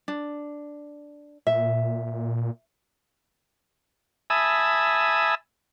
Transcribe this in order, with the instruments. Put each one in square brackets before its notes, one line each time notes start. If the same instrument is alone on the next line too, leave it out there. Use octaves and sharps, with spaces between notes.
[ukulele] D4
[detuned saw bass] A#2 [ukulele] E5
[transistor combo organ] E5 G#5 A5 B5 D#6 E6